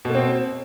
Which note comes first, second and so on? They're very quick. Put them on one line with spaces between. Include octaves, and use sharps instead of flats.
B2 A#3 C4